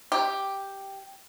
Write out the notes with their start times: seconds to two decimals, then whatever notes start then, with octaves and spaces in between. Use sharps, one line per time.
0.12 G4